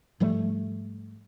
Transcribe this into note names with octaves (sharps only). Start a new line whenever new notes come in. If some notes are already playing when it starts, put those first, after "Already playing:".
G#2 F3 G3 A3